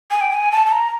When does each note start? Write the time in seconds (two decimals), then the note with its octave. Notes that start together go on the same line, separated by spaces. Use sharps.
0.10 G#5
0.21 G5
0.30 G#5
0.51 A5
0.66 A5
0.72 A#5